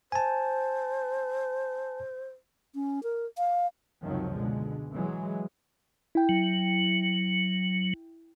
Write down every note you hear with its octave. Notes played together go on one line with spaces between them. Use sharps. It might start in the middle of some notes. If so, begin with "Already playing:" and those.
C5 G#5 A5
C#4
A#4
F5
C#2 F#2 C3 D#3 F3 F#3
B2 D3 G#3
E3 F#3 G#3
E4 G5
F#3